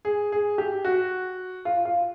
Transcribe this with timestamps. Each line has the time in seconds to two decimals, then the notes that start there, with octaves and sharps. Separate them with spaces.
0.05 G#4
0.32 G#4
0.58 G4
0.85 F#4
1.65 F4
1.85 F4